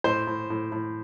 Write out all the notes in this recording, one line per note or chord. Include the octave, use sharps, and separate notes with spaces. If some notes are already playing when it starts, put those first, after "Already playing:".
A2 C5
A2
A2
A2